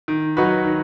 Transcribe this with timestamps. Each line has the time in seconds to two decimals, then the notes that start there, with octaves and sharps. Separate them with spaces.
0.08 D#3
0.37 F#3 D#4 F#4 B4
0.65 D#3